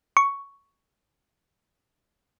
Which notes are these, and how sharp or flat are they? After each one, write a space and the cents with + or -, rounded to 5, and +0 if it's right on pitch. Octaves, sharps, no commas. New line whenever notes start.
C#6 +5